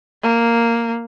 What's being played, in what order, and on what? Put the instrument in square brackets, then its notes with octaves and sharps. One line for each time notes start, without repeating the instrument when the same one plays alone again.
[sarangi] A#3